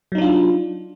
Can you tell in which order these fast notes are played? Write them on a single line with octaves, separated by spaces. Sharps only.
F#3 D#4 D4 F4